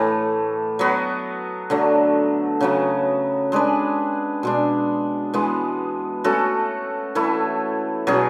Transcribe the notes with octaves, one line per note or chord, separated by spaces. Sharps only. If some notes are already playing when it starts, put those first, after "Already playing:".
Already playing: A2 E3 A3
F#3 B3 F#4
D3 F#3 A3
C#3 F#3 B3
G#3 D4 G#4 B4
B2 G#3 D4
E3 G#3 B3
A3 C#4 F#4 A4
E3 A3 E4
B2 F#3 C#4 G#4